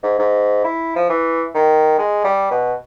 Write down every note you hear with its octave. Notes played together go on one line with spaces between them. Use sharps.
G#2
G#2
E4
F3
E3
D#3
G#3
G3
B2